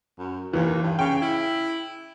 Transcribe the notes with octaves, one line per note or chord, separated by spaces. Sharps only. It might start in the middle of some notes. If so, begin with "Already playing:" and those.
F#2
D#2 E3
G2
C#3 G5
E4